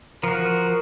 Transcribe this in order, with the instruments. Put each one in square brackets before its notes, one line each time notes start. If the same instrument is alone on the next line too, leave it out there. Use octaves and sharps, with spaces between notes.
[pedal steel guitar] F3 F#4 [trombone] A#4